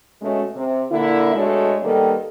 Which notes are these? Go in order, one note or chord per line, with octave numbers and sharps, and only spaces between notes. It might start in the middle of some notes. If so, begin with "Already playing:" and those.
B2 G#3 A3 C#4
C3
A#2 D3 A#3 E4
B2 G#3 A3 D4 A4 C#5
D#3 G3 A#3 B3 A4